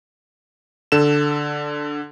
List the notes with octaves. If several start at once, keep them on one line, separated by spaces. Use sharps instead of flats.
D3 A4 E7